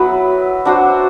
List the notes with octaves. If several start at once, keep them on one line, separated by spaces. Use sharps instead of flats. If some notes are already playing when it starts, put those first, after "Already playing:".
Already playing: F#3 B3 E4 B4
D4 F#4 C5